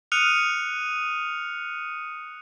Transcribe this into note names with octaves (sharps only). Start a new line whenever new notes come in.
D#6 F6 F#6 C#7 D#7 F7